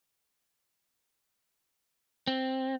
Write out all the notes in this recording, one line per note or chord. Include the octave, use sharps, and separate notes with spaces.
C4